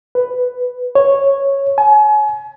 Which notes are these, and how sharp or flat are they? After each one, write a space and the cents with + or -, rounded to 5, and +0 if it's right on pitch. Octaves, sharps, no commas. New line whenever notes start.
B4 +5
C#5 -5
G#5 +35